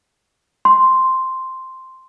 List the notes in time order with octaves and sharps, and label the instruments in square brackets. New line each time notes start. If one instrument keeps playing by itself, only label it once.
[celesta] C6